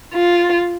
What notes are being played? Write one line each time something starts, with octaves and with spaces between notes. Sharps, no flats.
F4